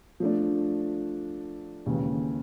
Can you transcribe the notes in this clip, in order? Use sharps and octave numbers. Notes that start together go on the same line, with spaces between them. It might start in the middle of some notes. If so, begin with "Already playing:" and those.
F3 A3 D4
D#2 C#3 E3 G#3